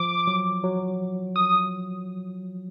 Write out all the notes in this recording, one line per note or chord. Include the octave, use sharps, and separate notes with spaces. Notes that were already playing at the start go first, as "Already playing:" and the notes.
Already playing: F3 D6
F#3
F#3
D#6